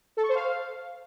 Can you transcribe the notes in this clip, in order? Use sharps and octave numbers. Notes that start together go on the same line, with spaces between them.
A4
C#6
C5
F5